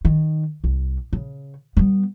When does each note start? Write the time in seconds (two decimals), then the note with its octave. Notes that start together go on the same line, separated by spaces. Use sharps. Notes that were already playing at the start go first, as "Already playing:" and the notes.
0.05 D#3
0.64 C2
1.13 C#3
1.77 G3 B3